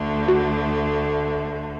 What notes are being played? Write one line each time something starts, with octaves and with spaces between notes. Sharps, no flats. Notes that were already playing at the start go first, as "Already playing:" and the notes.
Already playing: D2 D3 A3
F#4